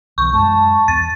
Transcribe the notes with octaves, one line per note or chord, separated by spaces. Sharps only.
B1 E3 C#6
F#2 A2 G#3 A5
E2 A6